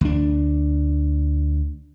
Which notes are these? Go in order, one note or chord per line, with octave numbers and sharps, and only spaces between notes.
D2 D4